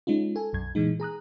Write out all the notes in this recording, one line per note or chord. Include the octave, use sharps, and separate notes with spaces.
G#3 C#4 D#4 F4
A4 G#5
B1 F#2 G#6
A#2 E3 G#3 D#4
G#4 A#5 D#6 F#6